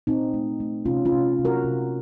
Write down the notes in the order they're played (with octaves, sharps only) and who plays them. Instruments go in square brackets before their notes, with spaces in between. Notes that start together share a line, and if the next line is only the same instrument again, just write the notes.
[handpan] A#2 C4 D#4
A3
A3
C3 C#4 F4
C#4 F4
C3
C3
F#4 A#4
C3